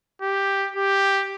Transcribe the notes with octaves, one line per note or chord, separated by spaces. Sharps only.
G4
G4